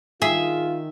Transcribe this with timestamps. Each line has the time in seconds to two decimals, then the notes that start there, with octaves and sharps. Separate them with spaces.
0.22 D#3 F4 G#4 E5